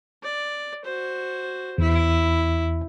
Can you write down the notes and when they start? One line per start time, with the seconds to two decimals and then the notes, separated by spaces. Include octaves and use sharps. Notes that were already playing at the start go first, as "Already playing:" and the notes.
0.23 D5
0.85 F#4 C5
1.78 E2 E4